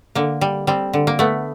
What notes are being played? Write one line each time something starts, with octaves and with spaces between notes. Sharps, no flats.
D3 A#3
G3
G3 C4
D3
A#3
A3 B3